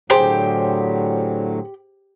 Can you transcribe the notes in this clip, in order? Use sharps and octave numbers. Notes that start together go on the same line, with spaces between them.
A2 D3 F#3 G4 G#4 C5